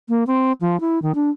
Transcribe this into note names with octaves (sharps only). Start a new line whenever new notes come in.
A#3
C4
F3
E4
D#3
D4